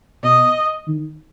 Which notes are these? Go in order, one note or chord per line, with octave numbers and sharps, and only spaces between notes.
B2 D#5
D#3